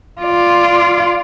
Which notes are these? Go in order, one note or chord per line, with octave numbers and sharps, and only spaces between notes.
F4 D5